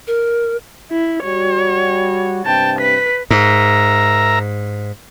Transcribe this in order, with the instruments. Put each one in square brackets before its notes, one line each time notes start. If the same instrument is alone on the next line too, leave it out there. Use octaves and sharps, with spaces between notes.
[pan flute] A#4
[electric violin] E4
[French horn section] G3 F#4 [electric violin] C#5
[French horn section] G2 C3 [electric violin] G5 A5
[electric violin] B4 B6
[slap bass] G#2 [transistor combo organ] A#4 E5 A#5